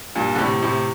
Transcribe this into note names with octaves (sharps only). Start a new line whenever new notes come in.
G2 A#2
D3
A2 C3
A2 C3